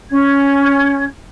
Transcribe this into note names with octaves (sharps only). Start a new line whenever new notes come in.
C#4 G#6